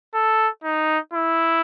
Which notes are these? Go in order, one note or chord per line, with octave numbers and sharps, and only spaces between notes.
A4
D#4
E4